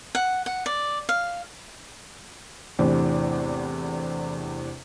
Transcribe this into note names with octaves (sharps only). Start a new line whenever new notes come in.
F#5
F#5
D5
F5
E2 A2 C3 E3 C4 D4